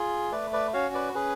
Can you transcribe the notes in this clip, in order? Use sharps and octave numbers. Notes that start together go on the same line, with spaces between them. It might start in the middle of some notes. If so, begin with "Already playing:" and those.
Already playing: F4 G#4
A3 B4 D5
B4 D5
C#4 F#4 C#5 F5
B4 D5
C#4 G#4 B4